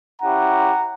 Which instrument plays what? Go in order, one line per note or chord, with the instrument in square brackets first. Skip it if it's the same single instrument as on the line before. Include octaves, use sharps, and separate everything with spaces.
[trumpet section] C#4 E4 G4 F#5 A#5